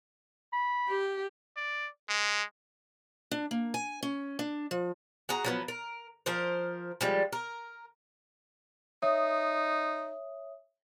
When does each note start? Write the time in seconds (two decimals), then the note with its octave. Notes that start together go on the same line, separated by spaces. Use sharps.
0.53 B5
0.89 G4
1.57 D5
2.09 G#3
3.31 D4
3.51 A#3
3.74 G#5
4.03 C#4
4.39 D4
4.71 F3
5.29 F#4 G#4 A#5
5.44 F3 F#3 B3
5.68 A#4
6.26 F3 A#4 C5
7.01 F3 G3 G#3
7.33 A#4
9.02 D#4 C#5 E5 D#6